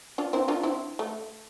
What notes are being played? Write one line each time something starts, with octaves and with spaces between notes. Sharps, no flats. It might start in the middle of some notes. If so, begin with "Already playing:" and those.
D4 F4
C4 E4
D4 F4
C4 E4
A3